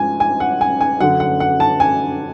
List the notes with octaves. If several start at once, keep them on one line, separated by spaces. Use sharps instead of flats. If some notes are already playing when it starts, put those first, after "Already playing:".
Already playing: G#2 F3 G#5
G#5
F#5
G#5
G#5
F#2 D3 F#3 F#5
F#5
F#5
A5
G#5